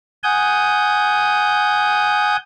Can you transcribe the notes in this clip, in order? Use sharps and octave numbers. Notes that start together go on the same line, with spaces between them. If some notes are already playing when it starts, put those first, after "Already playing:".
F#5 G#5 D#6 G6